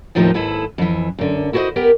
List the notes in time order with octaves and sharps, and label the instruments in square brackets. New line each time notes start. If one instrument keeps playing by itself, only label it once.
[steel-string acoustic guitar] D#2 A2 F3 D#4 G4 C5
D#2 G#2 E4 A4 B4
F2 E3
F#2 D3
E4 F#4 G#4 A#4 C5 D#5
B3 G4 A#4